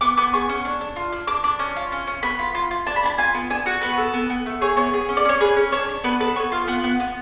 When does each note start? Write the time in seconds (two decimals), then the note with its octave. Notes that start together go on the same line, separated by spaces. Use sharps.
0.01 B3 D6
0.17 B3 D6
0.33 G#4 C#6
0.49 C#4
0.65 D4
0.81 D4
0.96 F4
1.12 D4
1.27 D4 D6
1.44 D4 D6
1.59 C#4
1.76 F4
1.92 C#4
2.07 C#4
2.23 B3 B5
2.39 F4
2.55 F4
2.71 F4
2.87 D4 A5
2.96 B5
3.03 D4 A5
3.18 F4 G#5
3.34 B3
3.50 D4 G#5
3.66 F#4 F#5
3.81 B3 B4
3.98 A4
4.14 B3
4.30 B3
4.46 A3
4.61 G#4 C#5
4.77 B3 C#5
4.93 G#4
5.09 C#4
5.17 D5
5.25 C#4 C#5
5.41 G#4 B4
5.56 C#4
5.72 D4 C#5
5.89 D4
6.04 B3 B4
6.20 A4 B4
6.35 B3 C#5
6.52 F4 F5
6.67 B3 F#5
6.84 B3
7.00 B3